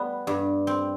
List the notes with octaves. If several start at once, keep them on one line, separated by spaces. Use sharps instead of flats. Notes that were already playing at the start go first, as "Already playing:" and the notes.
Already playing: G3 B3
G2
C4